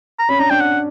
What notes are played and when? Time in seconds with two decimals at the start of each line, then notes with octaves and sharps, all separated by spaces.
0.19 A#5
0.29 C#4 B5
0.39 D4 A#5
0.50 D4 G5
0.61 F#5